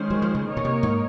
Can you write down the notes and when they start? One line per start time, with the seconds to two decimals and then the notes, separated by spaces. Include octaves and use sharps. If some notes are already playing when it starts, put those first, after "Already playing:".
Already playing: D#3 G#3 C#4 G#4 C5
0.10 F#3
0.22 F3
0.35 C#3
0.47 A#3 D#4 A#4 C#5
0.57 A#2
0.65 C3
0.83 G#2